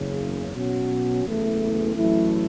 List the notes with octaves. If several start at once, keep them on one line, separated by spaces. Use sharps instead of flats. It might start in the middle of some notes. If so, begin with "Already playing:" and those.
Already playing: F#1 E2 C#3
B2 F#3 C#4 F#4
F#1 E2 C#3 E3 A3
A1 A2 F#3 A3 E4